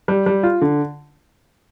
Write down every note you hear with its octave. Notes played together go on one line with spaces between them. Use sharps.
G3
G3
F4
D3